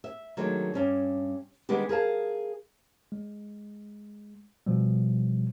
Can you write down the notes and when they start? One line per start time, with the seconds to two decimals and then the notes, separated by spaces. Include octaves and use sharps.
0.04 E5
0.37 D#3 F#3 G#3 A3 D4
0.74 G2 C#4 D4
1.69 D#3 G3 G#3 B3 D4 G4
1.89 G#4 A#4 F5 A5
3.12 G#3
4.66 B2 F3 G3